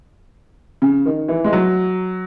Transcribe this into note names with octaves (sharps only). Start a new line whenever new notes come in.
C#3
D#3
E3
G#3
F#3